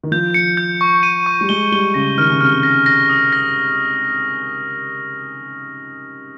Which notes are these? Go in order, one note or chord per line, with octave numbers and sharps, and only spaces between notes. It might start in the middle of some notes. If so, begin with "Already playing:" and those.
D#3
F3 G6
C#7
G6
C#6
D#7
C#6
G3
G#3 G7
G3 G7
C#3 A#6
D#3 F6
C#3
C3 F6
C#3
A#6
A#6
D#6
A#6